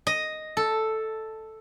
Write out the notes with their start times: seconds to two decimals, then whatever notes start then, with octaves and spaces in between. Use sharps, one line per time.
0.07 D#5
0.57 A4